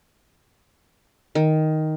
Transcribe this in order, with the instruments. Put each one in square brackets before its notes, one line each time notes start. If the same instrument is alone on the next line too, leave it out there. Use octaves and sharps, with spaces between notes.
[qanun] D#3